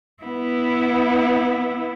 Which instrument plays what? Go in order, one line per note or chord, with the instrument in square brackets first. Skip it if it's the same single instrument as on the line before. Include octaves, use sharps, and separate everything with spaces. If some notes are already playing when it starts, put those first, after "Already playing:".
[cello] B3 E4